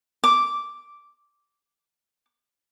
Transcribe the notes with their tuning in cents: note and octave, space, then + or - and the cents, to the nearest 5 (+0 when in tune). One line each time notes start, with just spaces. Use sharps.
D6 -5